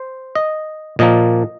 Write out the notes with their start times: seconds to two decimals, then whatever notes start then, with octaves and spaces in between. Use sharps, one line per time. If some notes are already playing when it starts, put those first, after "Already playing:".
Already playing: C5
0.35 D#5
0.99 A#2 F3 A#3 D#5